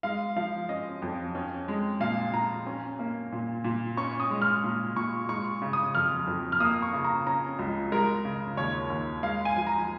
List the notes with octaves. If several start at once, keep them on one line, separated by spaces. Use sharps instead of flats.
G#3 F5
F3 F5
C#4 D#5
F2
C#4
G#3
A#2 F5
A#2 A#5
C#4
A#3
A#2
A#2
C#4 C#6
D#6
G#3
F6
A#2
A#2 C#6
G#3 C#6
C#3
D#6
F2 F6
F2
F6
A#3 D#6
C#6
C#3
A#5
C#4 A#5
C#2
G#3 A#4
C#3
D#2 C#5
D#2
G#3 F5
G#5
F3
A#5